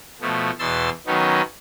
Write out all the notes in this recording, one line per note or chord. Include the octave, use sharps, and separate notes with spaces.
B2 F3 A3
E2 B2 C6 E6 A6
D#3 F#3 B3 C#4 D#4